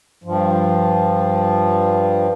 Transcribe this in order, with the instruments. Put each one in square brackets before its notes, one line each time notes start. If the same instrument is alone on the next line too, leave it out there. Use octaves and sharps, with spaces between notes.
[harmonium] G2 F3